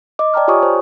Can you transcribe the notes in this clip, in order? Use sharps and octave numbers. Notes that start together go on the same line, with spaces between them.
D#5 D6
D5 G5 A5 A#5 F6
F4 G4 C#5 G#5 C#6 D#6
C5